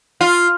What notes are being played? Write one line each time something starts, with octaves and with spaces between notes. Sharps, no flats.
F4